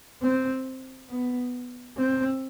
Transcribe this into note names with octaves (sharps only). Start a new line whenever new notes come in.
C4
B3
C4